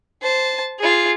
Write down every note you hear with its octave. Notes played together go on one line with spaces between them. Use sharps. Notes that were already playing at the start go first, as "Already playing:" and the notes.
C5 A5
F4 G#4